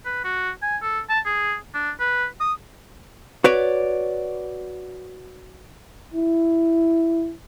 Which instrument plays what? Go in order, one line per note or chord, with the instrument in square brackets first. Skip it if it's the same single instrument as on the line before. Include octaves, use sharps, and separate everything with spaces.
[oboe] B4
F#4
G#5
A4
A5
G#4
D4
B4
D#6
[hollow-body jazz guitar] F#4 B4 C#5 D5
[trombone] E4